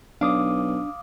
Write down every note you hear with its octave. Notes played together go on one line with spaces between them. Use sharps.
B1 D4 F5 D6 D#6